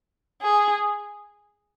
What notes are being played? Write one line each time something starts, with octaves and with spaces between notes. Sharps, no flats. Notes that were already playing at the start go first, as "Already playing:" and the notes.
G#4